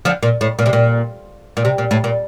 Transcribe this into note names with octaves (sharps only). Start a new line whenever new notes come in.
D3 F3
A#2
A2
A#2
C3
A#2
A#2
C3
A#2
A2
A#2